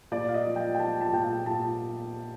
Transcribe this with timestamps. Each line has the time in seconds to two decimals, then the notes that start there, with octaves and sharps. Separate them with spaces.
0.12 A#2 D5
0.29 F5
0.34 D#5
0.45 F3
0.56 G5
0.75 G5
0.79 F3 A5
1.01 A5
1.13 A#2 G5
1.23 F5
1.45 A#2 A5